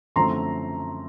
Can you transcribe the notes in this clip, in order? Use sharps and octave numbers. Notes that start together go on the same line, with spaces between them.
F#2 D3 F3 A3 C4 A#5 C6